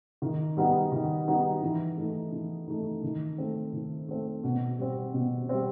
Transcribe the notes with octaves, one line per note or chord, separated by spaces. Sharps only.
D#3
G3 B3 D#4 F#4
D#3
G3 B3 D#4 F#4
E3
A3 D#4
E3
A3 D#4
D#3
A3 C4
D#3
A3 C4
B2
G3 C4
B2
G3 C4